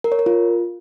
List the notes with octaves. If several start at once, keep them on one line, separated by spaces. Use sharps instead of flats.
A#4
C#5
A#4
F4